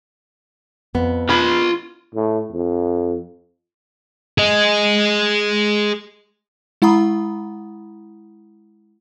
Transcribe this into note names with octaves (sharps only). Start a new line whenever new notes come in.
F2 B3
F4 B5
A2
F2
G#4 D#5
G#3 E4 F#5 A#5 B5 D#6